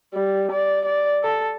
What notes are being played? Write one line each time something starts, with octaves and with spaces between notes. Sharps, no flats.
G3
D5
D5
A4